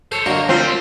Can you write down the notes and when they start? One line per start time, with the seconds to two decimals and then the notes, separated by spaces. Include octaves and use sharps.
0.12 A4 C5 C#5
0.26 D3 F#3 A#3 A#4 D#5
0.49 G3 A3 C4 F4 C5